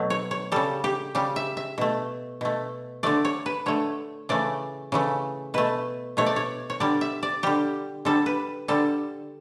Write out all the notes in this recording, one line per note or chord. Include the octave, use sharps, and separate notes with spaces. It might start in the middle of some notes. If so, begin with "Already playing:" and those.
Already playing: B2 F#3 A3
C#5
C#5
C#3 G3 A4
G4
C#3 G3 G4
E5
E5
B2 A3
B2 A3
D3 A3 D5
C#5
B4
D3 A3 C#5
C#3 E3 A3 D5
C#3 E3 A3
B2 A3 B4
B2 A3 C#5
D5
C#5
C#5
D3 G3 D5
E5
D5
D3 G3 G4
D3 G3 A4
B4
D3 G3 A4